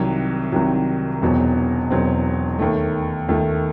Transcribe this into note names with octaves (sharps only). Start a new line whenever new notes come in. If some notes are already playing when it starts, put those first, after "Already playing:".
Already playing: C2 C3 D#3 F#3
C2 C3 D#3 F#3
E1 E2 B2 F#3 C4
E1 E2 B2 F#3 C4
D#2 D#3 A3
D#2 D#3 A3